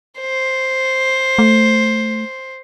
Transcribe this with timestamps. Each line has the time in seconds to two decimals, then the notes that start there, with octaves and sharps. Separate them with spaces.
0.20 C5
1.39 A3